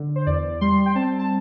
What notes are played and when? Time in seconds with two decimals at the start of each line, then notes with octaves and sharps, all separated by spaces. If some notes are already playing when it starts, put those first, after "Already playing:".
Already playing: D3
0.16 C5
0.26 E2 D5
0.61 G3 C6
0.86 G5
0.95 C4 A5
1.19 A5